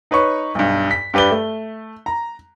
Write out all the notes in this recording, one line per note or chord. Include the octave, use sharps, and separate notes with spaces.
D#4 B4 C#5 C#6
B1 G2
B6
G2 G4 B4 D5 G7
A3
A#5